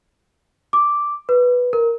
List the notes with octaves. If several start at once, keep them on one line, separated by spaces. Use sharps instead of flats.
D6
B4
A#4